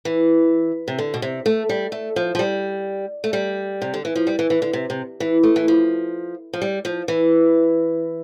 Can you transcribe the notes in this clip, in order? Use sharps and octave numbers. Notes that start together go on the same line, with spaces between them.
E3
C3
D3
B2
C3
A3
G3
A3
F3
F3
G3
A3
G3
C3
D3
E3
F3
G3
E3
E3
D3
C3
C3
E3
A3
E3
F3
F3
G3
F3
E3